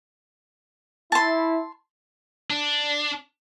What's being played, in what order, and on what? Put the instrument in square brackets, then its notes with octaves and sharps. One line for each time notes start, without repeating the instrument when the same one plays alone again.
[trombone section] E4 [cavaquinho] A5 C6
[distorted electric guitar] D4